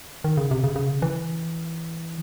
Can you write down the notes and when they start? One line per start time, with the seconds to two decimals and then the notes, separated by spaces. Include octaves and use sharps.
0.24 D#3
0.37 C#3
0.51 C3
0.64 C#3
0.76 C#3
1.02 E3